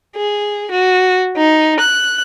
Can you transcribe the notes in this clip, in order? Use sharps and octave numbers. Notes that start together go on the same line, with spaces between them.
G#4
F#4
D#4
F#6